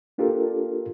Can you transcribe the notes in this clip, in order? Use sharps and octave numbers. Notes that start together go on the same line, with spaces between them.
A#3 D4 F4 G4 A4 A#4